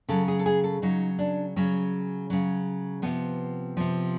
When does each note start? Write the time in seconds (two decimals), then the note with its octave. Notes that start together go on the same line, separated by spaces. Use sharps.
0.09 C#3 F#3 A4
0.28 G#4
0.39 A4
0.46 G#4
0.64 A4
0.82 C#3 F#3 D#4
1.19 D4
1.56 C#3 F#3 C#4
2.30 C#3 F#3
3.02 C3 F3 B3
3.77 C3 F3